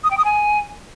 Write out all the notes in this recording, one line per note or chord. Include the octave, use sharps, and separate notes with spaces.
D#6
G5
D#6
G#5